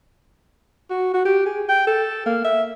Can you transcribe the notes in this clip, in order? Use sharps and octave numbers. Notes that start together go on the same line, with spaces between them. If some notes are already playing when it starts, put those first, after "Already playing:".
F#4
F#4
G4
G#4
G5
A4
A#3
E5